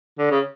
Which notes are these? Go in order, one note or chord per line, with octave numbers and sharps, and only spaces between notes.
D3
C#3